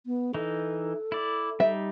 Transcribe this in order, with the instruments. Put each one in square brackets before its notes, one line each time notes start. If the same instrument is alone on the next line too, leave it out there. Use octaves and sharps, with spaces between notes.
[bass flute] B3
[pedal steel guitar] E3 D#4 [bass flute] A4
[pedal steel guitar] E4 D5
[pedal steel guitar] G3 D#4 [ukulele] E5